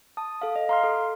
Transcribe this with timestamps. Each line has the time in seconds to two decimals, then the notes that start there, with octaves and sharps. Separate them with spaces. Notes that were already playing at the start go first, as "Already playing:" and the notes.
0.17 A5 D#6
0.42 A4 F5
0.56 D#5
0.69 F5 A#5 C6 F6
0.83 A4